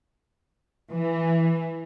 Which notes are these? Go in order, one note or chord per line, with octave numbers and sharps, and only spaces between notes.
E3